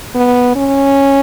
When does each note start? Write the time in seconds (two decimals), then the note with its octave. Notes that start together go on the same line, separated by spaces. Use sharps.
0.15 B3
0.56 C#4